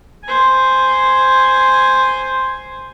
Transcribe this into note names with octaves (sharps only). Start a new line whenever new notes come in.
C5 G#5